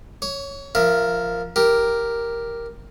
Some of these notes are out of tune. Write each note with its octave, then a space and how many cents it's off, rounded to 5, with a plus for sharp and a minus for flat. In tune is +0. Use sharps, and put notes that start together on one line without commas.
C#5 +0 C#6 +40
F3 +0 A#4 +0 E5 +25
G4 +0 A#4 +0